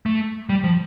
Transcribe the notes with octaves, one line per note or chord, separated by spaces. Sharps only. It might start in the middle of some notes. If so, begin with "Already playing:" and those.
A3
G3
F3